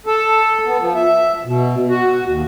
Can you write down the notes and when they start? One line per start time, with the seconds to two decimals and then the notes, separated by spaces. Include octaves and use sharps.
0.06 A4
0.66 B3
0.80 F3
0.95 E5
1.45 B2
1.88 F#4
2.26 D#2